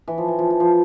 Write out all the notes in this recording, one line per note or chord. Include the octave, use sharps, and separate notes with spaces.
E3
F3
E3
F3
E3
F3